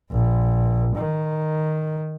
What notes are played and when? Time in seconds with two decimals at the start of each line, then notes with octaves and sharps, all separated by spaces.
0.11 A#1
0.95 D#3